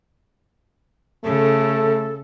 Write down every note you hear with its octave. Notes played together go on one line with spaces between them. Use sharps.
C#3 A3 A4